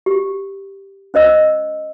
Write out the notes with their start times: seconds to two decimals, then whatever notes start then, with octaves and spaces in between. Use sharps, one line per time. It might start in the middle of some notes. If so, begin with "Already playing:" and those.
0.06 G4
1.14 C#4 C5 D#5 E6